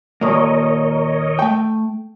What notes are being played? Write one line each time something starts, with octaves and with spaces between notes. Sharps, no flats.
D#2 A#2 A#3 A#4 C#5 D#5
A3 G5